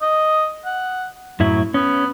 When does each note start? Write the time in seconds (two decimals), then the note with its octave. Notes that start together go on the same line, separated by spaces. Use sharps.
0.02 D#5
0.65 F#5
1.40 F#2 A2 F#3 E4
1.74 B3 C#4